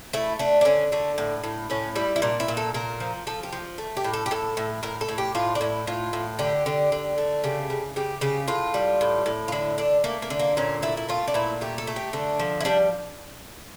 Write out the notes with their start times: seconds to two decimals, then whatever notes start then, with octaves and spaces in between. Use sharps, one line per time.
0.13 A3 E4
0.39 A3 D4
0.61 D4
0.65 D3 C#4
0.92 D3 A3
1.18 A2
1.44 A2
1.70 A2 C#4
1.95 G3 E4
2.16 E4
2.22 A#2 D4
2.40 E4
2.48 A#2
2.57 A4
2.74 A#2 A#4
3.00 F3
3.27 F3 A4
3.43 G4
3.52 F3
3.78 A3
3.97 G4
4.04 A2
4.13 A4
4.26 G4
4.31 A2 A4
4.57 A2
4.83 A2 A#4
5.01 A4
5.09 A2
5.18 G4
5.35 A2 F4
5.55 D4
5.61 A2 E4
5.87 A2 F4
6.13 A2
6.39 D3 G4
6.66 D3
6.92 D3
7.18 A3
7.44 C#3 G4
7.70 C#3
7.96 C#3 G4
8.21 C#3 G4
8.48 A2 F4
8.74 G3
9.01 A2
9.26 A2
9.48 F4
9.52 D3 E4
9.78 D3 D4
10.04 A3 A#3
10.22 A#3
10.30 D3
10.39 A#3
10.57 A#2 C#4
10.82 A3 E4
10.97 E4
11.09 A3 F4
11.28 D4
11.34 A#2 E4
11.61 A3 G4
11.78 A4
11.87 A3
11.96 G4
12.13 D3 D4
12.39 F3
12.60 E4
12.65 G3 D4